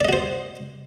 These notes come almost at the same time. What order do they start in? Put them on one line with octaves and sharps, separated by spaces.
D5 D#5 F#4 C5